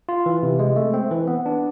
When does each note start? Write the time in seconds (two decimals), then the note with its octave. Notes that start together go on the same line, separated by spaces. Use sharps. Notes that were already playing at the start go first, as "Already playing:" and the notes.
0.09 F4
0.26 E3
0.43 C3
0.59 G#3
0.76 A3
0.94 C4
1.11 E3
1.27 B3
1.46 D4